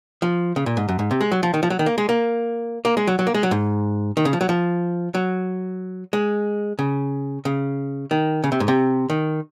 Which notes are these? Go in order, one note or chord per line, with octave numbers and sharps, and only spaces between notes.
F3
C#3
A#2
G#2
F#2
G#2
C3
G#3
F#3
F3
D#3
F3
F#3
D#3
A#3
G#3
A#3
A#3
G#3
F#3
F#3
A#3
G#3
F#3
G#2
D#3
C#3
F3
F#3
F3
F#3
G#3
C#3
C#3
D#3
C#3
C3
G#2
C3
D#3